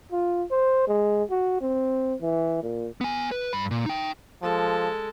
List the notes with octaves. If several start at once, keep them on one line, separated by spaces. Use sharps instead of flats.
F4
C5
G#3
F#4
C4
E3
A#2
B3 G#5
B4
G2 B5
A#2
D#4 G5
F3 G#3 A4